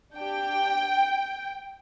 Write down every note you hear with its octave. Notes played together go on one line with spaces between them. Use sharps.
D4 G4 G5